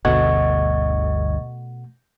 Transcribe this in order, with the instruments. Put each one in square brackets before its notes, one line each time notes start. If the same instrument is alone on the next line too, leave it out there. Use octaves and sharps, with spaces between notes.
[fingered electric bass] G1 D2 [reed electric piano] B2 A3 F#5 [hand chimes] D#5 C#6 G#6